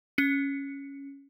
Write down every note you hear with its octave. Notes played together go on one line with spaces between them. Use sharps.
C#4 C#7